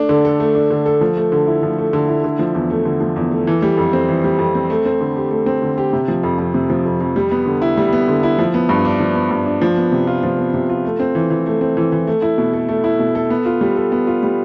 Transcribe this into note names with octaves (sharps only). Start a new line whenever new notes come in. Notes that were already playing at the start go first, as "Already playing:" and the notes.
Already playing: A3 D4
D3
A4
A3
D4
D3
A4
F3
A3
D3
E4
F3
A3
D3
E4
D3
F3
E2
A3
D3
F3
E2
A3
E3
G3
F2
C4
E3
G3
F2
C4
A3
C4
D3
G4
A3
C4
D3
G4
C3
F3
F2
F2
C3
F3
F2
F2
G3
B3
D3
E4
G3
B3
D3
E4
F3
B3
G2
D4
F3
B3
G2
D4
F3
B3
C3
F4
F3
B3
C3
F4
A3
C4
E3
E3
A3
C4
E3
E3
A3
E4
B2
A4
A3
E4
B2
A4
B3
F4
G3
A4
B3
F4
G3